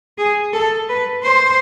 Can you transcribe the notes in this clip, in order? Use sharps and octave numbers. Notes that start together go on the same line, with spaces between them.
G#4
A4
B4
C5